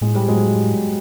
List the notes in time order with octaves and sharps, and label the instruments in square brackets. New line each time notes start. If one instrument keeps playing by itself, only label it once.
[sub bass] A2 [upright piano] G#3
[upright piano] G3
F#3 G#3